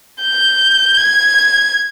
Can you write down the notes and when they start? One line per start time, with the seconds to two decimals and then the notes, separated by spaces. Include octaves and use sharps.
0.22 G6
0.97 G#6